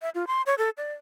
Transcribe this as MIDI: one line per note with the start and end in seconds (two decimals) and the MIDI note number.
0.02 0.10 76
0.15 0.25 65
0.27 0.42 84
0.46 0.55 73
0.58 0.70 69
0.77 0.93 74